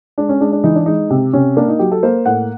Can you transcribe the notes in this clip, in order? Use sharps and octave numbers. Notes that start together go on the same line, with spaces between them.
G#3 D4
C#4
G#3 D4
D4
E3 D#4
D4
G#3 D#4
C3
C3 C#4
A#3 D4
D#4
F#3 G4
A4
A#3 C5
A2 F#5